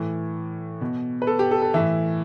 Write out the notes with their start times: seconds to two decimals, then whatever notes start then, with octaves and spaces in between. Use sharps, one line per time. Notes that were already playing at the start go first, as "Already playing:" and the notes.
Already playing: A2 E3
0.81 B2
1.22 B4
1.27 A4
1.39 G4
1.51 A4
1.62 A4
1.74 A2 E3 E5